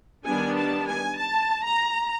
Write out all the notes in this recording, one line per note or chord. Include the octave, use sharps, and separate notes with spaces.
D#3 G3 B3 D4 G#5
A5
G#5
A5
A#5